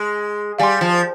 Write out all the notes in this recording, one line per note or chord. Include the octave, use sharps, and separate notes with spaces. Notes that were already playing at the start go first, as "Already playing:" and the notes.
Already playing: G#3
G3 F5 G#5 C6
F3